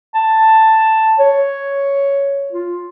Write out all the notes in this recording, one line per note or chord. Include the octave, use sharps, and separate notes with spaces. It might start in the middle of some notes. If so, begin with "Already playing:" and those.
A5
C#5
F4